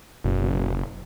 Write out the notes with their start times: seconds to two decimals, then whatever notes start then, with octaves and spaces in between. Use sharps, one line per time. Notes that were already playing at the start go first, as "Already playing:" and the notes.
0.24 F#1 F#2 B2